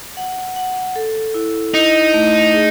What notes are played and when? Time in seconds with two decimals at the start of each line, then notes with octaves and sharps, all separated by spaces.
0.17 F#5
0.56 F#5
0.96 A4
1.34 E4
1.74 D#4 E4
2.14 A3
2.53 G#4